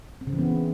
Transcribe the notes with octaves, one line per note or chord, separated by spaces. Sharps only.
C4
C#3
E3
B3